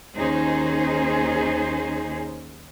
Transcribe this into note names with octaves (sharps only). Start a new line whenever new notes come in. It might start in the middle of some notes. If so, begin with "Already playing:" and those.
D#2 C#4 D#4 G#4 C5